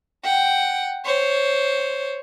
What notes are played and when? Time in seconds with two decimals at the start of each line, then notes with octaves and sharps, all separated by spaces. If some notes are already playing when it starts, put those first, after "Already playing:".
0.24 F#5 G5
1.05 C5 C#5